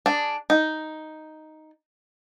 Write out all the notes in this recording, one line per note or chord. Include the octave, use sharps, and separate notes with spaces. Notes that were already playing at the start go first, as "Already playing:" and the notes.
D4 G#4
D#4